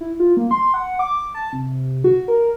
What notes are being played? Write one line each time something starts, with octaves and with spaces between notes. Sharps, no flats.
E4
F4
A#3
C6
F#5
D6
A5
C3
F#4
A#4